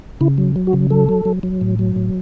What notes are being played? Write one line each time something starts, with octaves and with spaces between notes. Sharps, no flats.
C#3 E4
F#3
F#3
F#4
C#3
F#3 A4
F#3
F#3
F#3
A2
F#3
A2